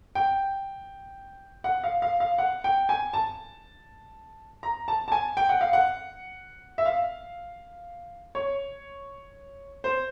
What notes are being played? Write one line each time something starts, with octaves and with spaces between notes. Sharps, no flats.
G5
F#5
F5
F5
F5
F#5
G5
G#5
A5
A#5
A5
A5
G#5
G5
F#5
F5
F#5
E5
F5
C#5
C5